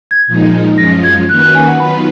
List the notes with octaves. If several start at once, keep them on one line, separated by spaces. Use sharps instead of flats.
G#6
A#2 F3 G#3 D#4
F#2 F3 G#3 C#4 F4 A#6
G#6
D#3 A#3 C#4 F#4 B4 F#6
F#6
G#5
F#5
D#3 F#3 B3 F4 B4 B5